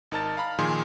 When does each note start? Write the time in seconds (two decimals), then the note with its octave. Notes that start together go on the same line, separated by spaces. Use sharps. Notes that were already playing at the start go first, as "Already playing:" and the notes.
0.11 G#1 D#4 A#4 A5 F6 A6
0.37 F5 A#5 B5 F6
0.59 A#2 D#3 F3 G#4 C6